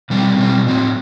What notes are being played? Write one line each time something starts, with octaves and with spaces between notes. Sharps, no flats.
B2 G3 C4
B2 G3 C4
A2 F#3 C4